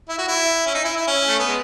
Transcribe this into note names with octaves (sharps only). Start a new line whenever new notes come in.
E4
F#4
E4
C#4
D#4
E4
E4
C#4
A3
B3
G#3